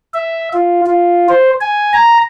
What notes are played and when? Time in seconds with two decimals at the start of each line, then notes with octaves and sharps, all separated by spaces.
0.14 E5
0.53 F4
0.86 F4
1.29 C5
1.61 G#5
1.93 A#5